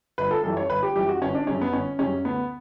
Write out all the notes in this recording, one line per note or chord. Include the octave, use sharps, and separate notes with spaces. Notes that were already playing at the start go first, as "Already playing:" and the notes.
G1 B4
A4
F#2 E3 G3 A4
C#5
G1 B4
G4
F#2 E3 G3 G4
F#4
G1 C#4
D4
F#2 C#3 G3 C#4
B3
G1 C#4
F#2 C#3 G3 C#4
D2 B3